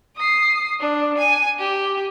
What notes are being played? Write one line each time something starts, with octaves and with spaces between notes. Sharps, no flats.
D#6 C7
D4
G#5 D#7
G4